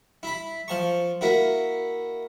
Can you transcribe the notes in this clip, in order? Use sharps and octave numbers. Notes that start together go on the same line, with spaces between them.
E4 B5
F3 A5 C#6
A#3 E4 F#4